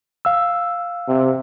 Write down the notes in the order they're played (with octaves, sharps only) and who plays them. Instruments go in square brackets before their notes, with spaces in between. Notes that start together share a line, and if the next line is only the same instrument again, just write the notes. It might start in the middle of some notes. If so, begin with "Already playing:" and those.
[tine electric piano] F5 E6
[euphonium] C3